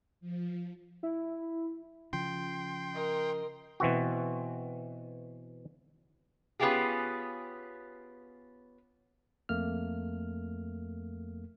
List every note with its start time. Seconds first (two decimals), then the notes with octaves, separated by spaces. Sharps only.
0.21 F3
1.03 E4
2.13 C#3 F3 G5 C6
2.93 A#4 D#5
3.80 B2 E3 C4 F#4
6.60 B3 C#4 F4 G4 G#4
9.49 F2 A3 A#3 F6